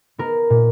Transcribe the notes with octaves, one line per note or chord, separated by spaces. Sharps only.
B3 A#4
A#2